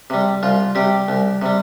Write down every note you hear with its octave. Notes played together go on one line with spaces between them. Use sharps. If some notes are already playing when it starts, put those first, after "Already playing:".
C3 G3
C2 F4
C3 G3 G4
C2
C3 G3